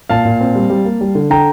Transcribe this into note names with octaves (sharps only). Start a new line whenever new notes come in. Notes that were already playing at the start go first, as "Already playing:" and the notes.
A#2 F5 A5
A#2
C4
G3
G3
A#3
G3
D3
D3 G5 A#5